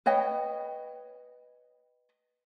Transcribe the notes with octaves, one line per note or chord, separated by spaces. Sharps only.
B4 C#5 D#5 G5